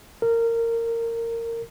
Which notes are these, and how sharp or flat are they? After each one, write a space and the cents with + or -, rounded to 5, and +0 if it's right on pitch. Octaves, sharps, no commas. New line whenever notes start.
A#4 -20